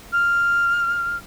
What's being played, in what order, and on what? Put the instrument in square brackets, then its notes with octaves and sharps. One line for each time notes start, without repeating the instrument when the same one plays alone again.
[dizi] F6